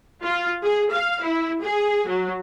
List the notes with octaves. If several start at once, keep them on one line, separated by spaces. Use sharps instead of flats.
F4
G#4
F5
E4
G#4
F#3